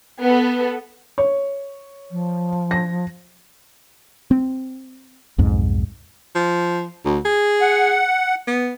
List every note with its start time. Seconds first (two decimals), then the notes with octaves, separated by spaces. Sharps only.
0.22 B3 A4
1.18 C#5
2.11 F3
2.71 A#6
4.31 C4
5.38 B1 F2 G#2
6.35 F3
7.05 D2
7.25 G#4
7.61 F#5
8.47 B3